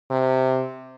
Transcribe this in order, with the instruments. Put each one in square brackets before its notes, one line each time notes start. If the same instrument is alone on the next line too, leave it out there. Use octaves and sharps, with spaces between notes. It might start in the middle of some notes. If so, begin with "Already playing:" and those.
[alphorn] C3